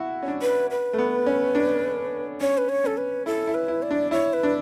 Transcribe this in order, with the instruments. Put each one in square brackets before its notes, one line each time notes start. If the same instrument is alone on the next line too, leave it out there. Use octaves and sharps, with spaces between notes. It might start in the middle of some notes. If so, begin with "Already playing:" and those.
Already playing: [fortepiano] E4 F#4
C#4
D4
[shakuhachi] B4
B4
[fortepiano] A3
B3
C#4
D4
[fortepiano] C#4 [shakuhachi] C#5
[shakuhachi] B4
C#5
[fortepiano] C#4 [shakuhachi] A4
[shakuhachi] B4
[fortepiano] E4 [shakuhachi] A4
[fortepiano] E4
[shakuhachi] B4
[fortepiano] E4
[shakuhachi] D5
[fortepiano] D4
[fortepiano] E4 [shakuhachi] C#5
[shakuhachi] B4
[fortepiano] D4